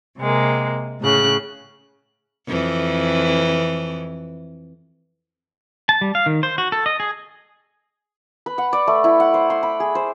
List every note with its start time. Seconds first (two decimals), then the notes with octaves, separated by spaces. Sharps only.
0.18 C3 G#3 A#3
1.00 A2 C#3 F#6
2.48 F2 E3
5.89 A5
6.01 G3
6.15 F5
6.26 D#3
6.43 C5
6.58 F#4
6.72 A4
6.86 D#5
7.00 G#4
8.46 B4
8.58 F#5
8.73 D5
8.87 A3
9.04 E4
9.20 F#5
9.34 C5
9.50 C6
9.63 B5
9.80 G#4
9.95 C5